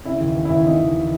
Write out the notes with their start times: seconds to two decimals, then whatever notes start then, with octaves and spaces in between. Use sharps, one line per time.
0.05 C#3 E4
0.20 D#2
0.35 E3
0.45 E4
0.50 D#2
0.65 C#3 D#4
0.80 D#2
0.96 E3